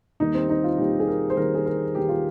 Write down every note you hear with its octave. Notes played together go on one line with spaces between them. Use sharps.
D#2 D#3 G3 D#4
C4
D#4
F4
D#2 D#3 G3 G4
G#4
A#4
C5
D#2 D#3 G3 A#4
G#4
A#4
D#2 D#3 G3 G4
F4